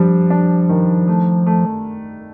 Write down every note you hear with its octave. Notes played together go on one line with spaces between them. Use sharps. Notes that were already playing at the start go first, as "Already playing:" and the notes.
Already playing: F3 G3 D4
D4
D#3
A3
A3